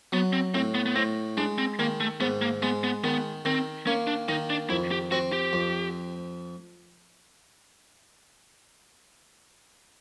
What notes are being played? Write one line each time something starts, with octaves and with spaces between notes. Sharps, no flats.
F#3 B3
C4
A2 C4
B3
B3
A2 C4
G#3 D4
C4
D#3 A#3
A3
G#2 B3
A#3
G#3 B3
B3
D#3 B3
D#3 C4
A#3 C#4
D4
D#3 D#4
D4
F2 E4
G4
C4 F#4
G4
F2